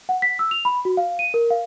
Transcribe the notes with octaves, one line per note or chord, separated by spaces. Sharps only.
F#5
B6
E6
F7
B5
F#4
F5
D#7
A#4
F5